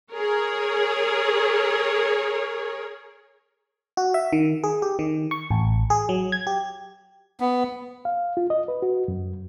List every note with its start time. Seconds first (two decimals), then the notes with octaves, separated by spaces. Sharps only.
0.13 G#4 A#4 C#5
3.97 F#4
4.14 E5
4.33 D#3
4.64 G#4
4.82 G4
4.99 D#3
5.31 C#6
5.51 A1
5.90 G#4
6.09 F#3
6.32 G#6
6.47 G4
7.40 B3
8.05 F5
8.37 F4
8.50 D#5
8.68 B4
8.82 F#4
9.08 F#2